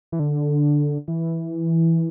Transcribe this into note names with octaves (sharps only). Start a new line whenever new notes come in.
E3
D3
E3